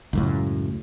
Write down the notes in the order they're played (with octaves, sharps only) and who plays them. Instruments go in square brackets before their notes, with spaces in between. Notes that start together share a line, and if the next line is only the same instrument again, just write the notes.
[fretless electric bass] C#2 F#2 A2